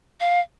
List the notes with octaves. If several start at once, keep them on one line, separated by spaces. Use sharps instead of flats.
F5